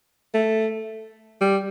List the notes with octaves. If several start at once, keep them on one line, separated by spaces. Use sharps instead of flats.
A3
G3